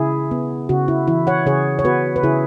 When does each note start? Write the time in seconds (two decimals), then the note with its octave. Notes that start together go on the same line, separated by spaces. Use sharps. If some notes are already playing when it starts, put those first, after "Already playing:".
Already playing: C#3 E4 G#4
0.31 B3
0.69 C#3 F#4
0.88 E4
1.08 E3 E4
1.27 C#5 F#5
1.46 C#3 G#4 C#5
1.79 C#5
1.85 B3 F#4 B4
2.16 B4
2.23 C#3 E4 G#4